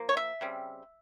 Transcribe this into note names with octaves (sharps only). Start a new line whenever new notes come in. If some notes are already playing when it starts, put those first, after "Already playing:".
Already playing: F3 A#3
C#5
E5
C#3 G3 C4